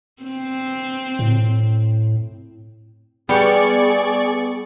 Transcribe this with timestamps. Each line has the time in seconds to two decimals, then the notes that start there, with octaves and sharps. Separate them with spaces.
0.23 C4
1.19 A2
3.29 G3 B3 G#4 D5 C#6 C#7